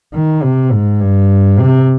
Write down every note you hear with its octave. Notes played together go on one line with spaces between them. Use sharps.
D#3
C3
G#2
G2
C3